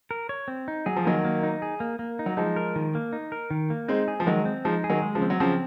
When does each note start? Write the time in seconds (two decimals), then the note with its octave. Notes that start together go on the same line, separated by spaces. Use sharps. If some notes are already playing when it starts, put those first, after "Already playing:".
0.11 A#4
0.29 C#5
0.48 C4
0.68 D#4
0.86 F#3 G#4
0.96 F3
1.05 D#3 F#3 A#3
1.25 A#3
1.43 D#4
1.62 G#4
1.80 A#3
1.99 A#3
2.19 D#4
2.26 F#3
2.37 F3 G#3 D#4
2.56 A#4
2.76 D#3
2.95 A#3
3.13 D#4
3.32 A#4
3.50 D#3
3.70 A#3
3.88 G#3 C4 D#4
4.08 G#4
4.20 F3
4.27 D#3 F#3 G#3
4.45 C4
4.65 F3 G#3 D#4
4.84 G#4
4.90 D#3 F#3
5.02 G#3
5.15 C#3 F3
5.22 C4
5.30 F#3
5.40 C#3 F3 C4